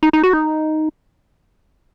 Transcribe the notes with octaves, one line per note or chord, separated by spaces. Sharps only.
D#4
D#4
F#4
D#4